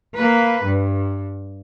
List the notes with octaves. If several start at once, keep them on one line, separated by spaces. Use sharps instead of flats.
A#3 B4
G2